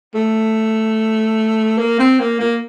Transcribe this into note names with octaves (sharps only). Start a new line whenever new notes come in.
A3
A#3
C4
A#3
A#3